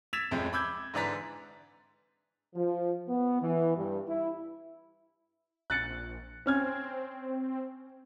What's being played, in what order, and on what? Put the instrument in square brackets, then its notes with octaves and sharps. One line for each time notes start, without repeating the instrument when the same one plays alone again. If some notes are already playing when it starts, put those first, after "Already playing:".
[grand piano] E6 G#6 A6 B6 E7 F7
A1 F2 F3 G#3
B5 D6 E6 G6 G#6
G#2 D3 E3 D5 A#5 B6
[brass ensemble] F3
B3
E3
G2
E4
[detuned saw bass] A#1 [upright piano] F#6 A6 C#7
[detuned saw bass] C4 [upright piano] C#4 F6 G#6